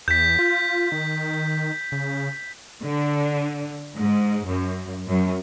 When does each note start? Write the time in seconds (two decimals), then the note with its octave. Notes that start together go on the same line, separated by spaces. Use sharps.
0.08 E2 G6 B6
0.39 F4
0.92 D#3
1.92 C#3
2.83 D3
3.96 G#2
4.47 F#2
5.10 F#2